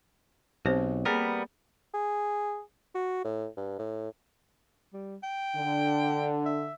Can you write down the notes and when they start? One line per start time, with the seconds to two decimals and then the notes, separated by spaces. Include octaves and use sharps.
0.66 B1 C4 G4 C5
1.05 G3 A#3 B3 G#4 A#4
1.94 G#4
2.95 F#4
3.25 A2
3.57 G2
3.79 A2
4.93 G3
5.23 G5
5.56 D3
6.45 E5